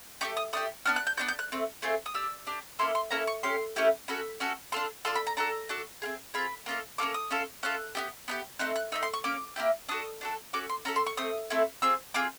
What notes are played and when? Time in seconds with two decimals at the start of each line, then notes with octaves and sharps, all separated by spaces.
0.21 A3 D4 G4 C#6
0.37 D#6
0.53 A3 D4 G4 D#6
0.85 B3 D4 F#4 F6
0.96 F#6
1.07 G6
1.17 B3 D4 F#4 G6
1.28 G6
1.39 F#6
1.52 A3 C4
1.82 A3 C4 F4 G#4
2.06 D#6
2.14 D4 G4 E6
2.47 D4 G4
2.79 A#3 C#4 E4 A4 C6
2.95 C6
3.11 A#3 C#4 E4 A4 A#5
3.27 C#6
3.43 A3 C#4 G4 C6
3.76 A3 C#4 E4 G4
4.08 C#4 F#4 A4 B5
4.40 C#4 F#4 A4
4.72 D4 F4 A4 C6
5.05 D4 F4 A4 C6
5.16 B5
5.27 A#5
5.37 D4 F#4 A4 A#5
5.69 D4 F#4 A4
6.02 C4 F4 G#4
6.34 C4 F4 G#4 B5
6.66 A#3 C#4 F4 A4
6.98 A#3 C#4 F4 A4 D6
7.14 D#6
7.31 C#4 F4 A4
7.63 C#4 F4 A4 F#6
7.95 B3 D#4 G4
8.28 B3 D#4 G4
8.59 A3 C4 D#4 F#6
8.76 F#6
8.92 A3 C4 D#4 E6
9.03 C6
9.14 C#6
9.24 A#3 C#4 D6
9.56 A#3 C#4 E4 G4
9.89 D4 F#4 A4 D#6
10.21 D4 F#4 A4
10.53 C#4 F#4 A4 D6
10.69 C6
10.85 C#4 F#4 A4 A#5
10.96 C6
11.06 C#6
11.17 A3 C4 D#6
11.50 A3 C4 E4 A4
11.82 C4 F4 G#4 E6
12.14 C4 F4 G#4 D6